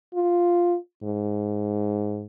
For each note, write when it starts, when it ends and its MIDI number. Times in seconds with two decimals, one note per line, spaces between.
0.14 0.76 65
1.03 2.27 44